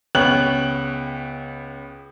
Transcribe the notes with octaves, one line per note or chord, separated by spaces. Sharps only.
C#2 B3 C#5 G5 F#6 F#7